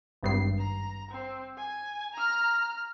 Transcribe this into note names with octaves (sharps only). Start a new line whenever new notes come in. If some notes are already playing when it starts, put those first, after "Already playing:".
G#1 G2 C7
A#5
C4
G#5
A#5 F6